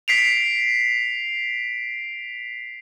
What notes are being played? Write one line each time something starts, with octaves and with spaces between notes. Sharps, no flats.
B6 C7 D7 F7